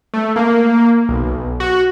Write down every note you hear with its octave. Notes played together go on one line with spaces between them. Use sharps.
A3
A#3
B1
F#4